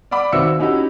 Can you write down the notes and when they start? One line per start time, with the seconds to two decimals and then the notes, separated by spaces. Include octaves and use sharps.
0.11 D5 F#5 B5 D6
0.32 D#2 C4 F#4 E5 E6 C#7
0.59 C#4 D#4 E4 F#4 G4